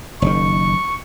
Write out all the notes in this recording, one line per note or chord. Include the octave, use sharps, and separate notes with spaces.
F#1 D#3 C#6